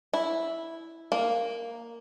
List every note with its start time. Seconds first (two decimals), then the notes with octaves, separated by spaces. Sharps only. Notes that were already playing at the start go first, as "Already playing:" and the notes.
0.13 E4
1.12 A#3